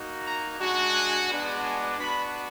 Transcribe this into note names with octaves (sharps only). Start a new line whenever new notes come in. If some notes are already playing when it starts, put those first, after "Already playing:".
Already playing: A#3 D#4 F#4
A#5
G#3 D4 F#4
G#5
G#3 B3 D4 F#4
G#5
B3 D4 F#4 B5